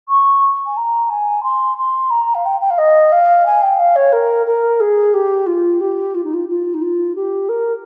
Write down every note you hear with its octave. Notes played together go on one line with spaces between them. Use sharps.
C#6
G#5
A#5
G#5
C6
C6
A#5
F5
G5
G5
F5
D#5
F5
G#5
G5
F5
C#5
A#4
A#4
G#4
G4
F4
G4
F4
D#4
F4
F4
D#4
F4
G4
A#4